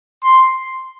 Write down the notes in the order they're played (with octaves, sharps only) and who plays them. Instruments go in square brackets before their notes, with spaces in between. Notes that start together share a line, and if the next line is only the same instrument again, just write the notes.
[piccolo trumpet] C6